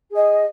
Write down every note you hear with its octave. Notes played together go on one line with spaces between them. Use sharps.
G#4 D#5